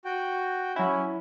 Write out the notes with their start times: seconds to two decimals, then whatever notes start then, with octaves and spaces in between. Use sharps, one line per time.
0.05 F#4 G5
0.76 F#3 C#4 E4